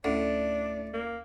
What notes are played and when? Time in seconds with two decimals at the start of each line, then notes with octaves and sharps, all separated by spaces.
0.04 D2 A2 C#4 D4 A4 D5
0.94 A#3